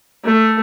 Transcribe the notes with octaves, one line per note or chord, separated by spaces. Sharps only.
A3